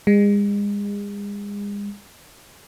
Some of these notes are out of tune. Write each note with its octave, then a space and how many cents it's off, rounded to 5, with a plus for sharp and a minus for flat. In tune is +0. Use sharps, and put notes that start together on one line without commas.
G#3 -35